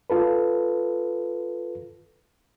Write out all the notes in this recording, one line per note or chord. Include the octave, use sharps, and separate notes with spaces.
F4 A4 B4